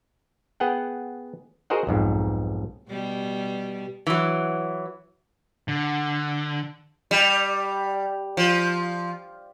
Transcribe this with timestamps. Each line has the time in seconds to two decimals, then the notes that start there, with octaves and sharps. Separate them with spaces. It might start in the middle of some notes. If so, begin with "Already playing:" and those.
0.60 B3 G#4 F#5 G5
1.70 F#4 G#4 A#4 C5 D#5 F#5
1.87 B1 F2 G#2
2.89 B2 G3
4.07 E3 F#3
5.68 D3
7.11 G3
8.37 F3